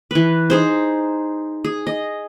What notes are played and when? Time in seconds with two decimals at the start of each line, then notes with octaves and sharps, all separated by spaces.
0.11 E3 B4
0.50 D#4 G#4 C5
1.64 G#4
1.87 D#5